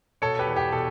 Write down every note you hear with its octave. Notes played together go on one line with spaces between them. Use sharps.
B2 A4 C#5
G4 B4
E2
G4
B2 A4